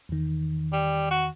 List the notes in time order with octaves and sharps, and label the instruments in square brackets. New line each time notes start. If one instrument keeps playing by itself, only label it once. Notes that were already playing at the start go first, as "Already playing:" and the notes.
[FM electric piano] E2 D#3
[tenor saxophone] G3
F#4